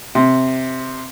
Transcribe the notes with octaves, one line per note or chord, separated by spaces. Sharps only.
C3